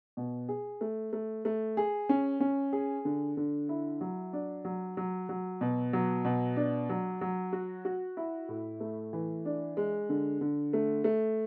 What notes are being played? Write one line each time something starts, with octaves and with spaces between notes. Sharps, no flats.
B2
G#4
A3
A3
A3
G#4
C#4
C#4
G#4
D3
D3
E4
F#3
D4
F#3
F#3
F#3
B2
F#3
B2
D4
F#3
F#3
F#4
F#4
E4
A2
A3
E3
D4
G#3
D3
D3
A3
A3